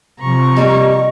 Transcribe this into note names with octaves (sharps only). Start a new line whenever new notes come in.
C3 F3 A#5 C#6
G3 A#3 G4 D#5